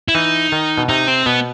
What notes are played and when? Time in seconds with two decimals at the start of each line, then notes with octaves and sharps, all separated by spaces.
0.08 E4
0.15 E3 D#4
0.52 D#3
0.78 B2
0.89 C3 D#4
1.08 C4
1.26 B2 B3